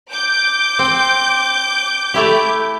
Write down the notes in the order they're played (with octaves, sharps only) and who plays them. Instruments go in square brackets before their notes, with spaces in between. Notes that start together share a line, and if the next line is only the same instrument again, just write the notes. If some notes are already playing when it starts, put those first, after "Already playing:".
[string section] D6 G6
[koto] C4
A3 E4 G4